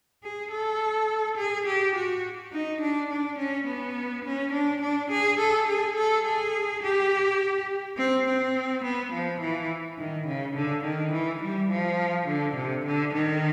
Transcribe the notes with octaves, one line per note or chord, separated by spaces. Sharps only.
G#4
A4
G#4
G4
F#4
D#4
D4
D4
C#4
B3
C#4
D4
D4
G#4
A4
G#4
A4
G#4
G4
C4
C4
B3
F3
E3
D#3
C#3
D3
D#3
E3
G3
F3
D3
C3
D3
D#3